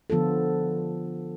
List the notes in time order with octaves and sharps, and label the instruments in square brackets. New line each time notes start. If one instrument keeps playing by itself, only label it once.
[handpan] D3 F3 B3 F4 A4